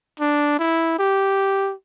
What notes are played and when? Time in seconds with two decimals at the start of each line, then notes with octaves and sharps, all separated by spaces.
0.20 D4
0.59 E4
0.99 G4